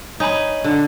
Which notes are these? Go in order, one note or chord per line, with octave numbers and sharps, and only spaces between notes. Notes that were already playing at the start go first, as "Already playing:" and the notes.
D#4 C#5 G#5 B5
D3